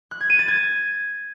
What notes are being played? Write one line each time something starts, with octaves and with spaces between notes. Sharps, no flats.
F#6
G#6
D#7
A6
G#6